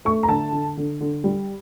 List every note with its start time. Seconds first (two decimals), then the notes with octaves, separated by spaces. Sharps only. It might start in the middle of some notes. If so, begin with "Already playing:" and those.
0.05 A3 C#6
0.23 A#5
0.29 D3 A5
0.52 D3
0.77 D3
1.00 D3
1.24 G3